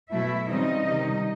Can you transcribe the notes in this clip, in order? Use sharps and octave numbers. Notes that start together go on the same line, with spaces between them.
B2 F#3 A3 E4 E5
C#3 E3 G3 C4 D#4 D#5
C3 D#3 G3